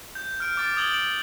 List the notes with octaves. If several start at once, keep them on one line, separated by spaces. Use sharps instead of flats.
G6
F6 D7
D6 A6 D7
D#6 G6 G#6 F#7 G7
D7 F#7